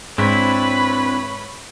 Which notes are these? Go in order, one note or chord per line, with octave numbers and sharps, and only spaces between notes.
G#2 C4 D4 E4 B4 C#5